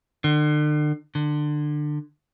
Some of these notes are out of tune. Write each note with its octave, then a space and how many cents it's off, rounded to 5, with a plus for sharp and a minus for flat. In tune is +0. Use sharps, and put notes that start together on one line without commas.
D3 +40
D3 +25